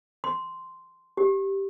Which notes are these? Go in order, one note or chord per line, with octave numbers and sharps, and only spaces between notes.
C6
G4